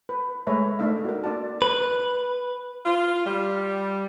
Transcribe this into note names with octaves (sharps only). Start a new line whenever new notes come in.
B4
G#3 A3 B4 C#5 E5 A#5
A3 A#3 D4 D#4 E5 F5
F#4 A#4
D4 D5 F#5 A5
B4
F4
G3